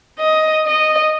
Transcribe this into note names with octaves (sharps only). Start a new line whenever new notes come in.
D#5
D#5